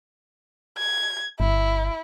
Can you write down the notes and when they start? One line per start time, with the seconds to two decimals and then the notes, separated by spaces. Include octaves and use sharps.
0.78 G#6
1.40 G1 E4